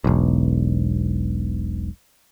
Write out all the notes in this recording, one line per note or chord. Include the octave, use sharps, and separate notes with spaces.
E1 B1